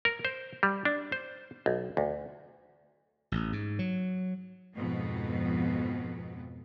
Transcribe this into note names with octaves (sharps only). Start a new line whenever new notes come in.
A#4
C5
G3
D4
C5
B1
D2
A1
G#2
F#3
F2 G#2 B2 B3